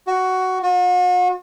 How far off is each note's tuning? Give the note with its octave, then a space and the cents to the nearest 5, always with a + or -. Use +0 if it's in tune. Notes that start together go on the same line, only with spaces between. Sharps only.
F#4 +10
F#4 -45